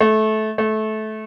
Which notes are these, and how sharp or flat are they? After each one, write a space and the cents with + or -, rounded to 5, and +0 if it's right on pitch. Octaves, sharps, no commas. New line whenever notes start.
A3 -20
A3 -20